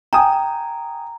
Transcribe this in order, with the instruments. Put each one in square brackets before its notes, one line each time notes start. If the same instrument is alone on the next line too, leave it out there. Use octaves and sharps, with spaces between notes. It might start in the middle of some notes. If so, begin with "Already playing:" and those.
[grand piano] G5 G#5 D#6 [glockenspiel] A#5